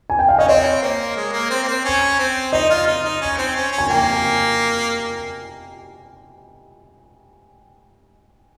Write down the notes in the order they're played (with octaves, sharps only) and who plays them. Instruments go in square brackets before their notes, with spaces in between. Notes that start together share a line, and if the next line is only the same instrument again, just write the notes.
[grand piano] G#5
G5
F5
[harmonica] C#4 [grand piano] D#5
[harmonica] C4 [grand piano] C#5
[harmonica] A#3
G#3
A#3
C4
A#3
C4
C#4
C4
[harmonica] D#4 [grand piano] D#5
[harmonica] F4
D#4
D#4
C#4
C4
C#4
C#4
[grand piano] G#5
[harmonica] A#3 [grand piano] G5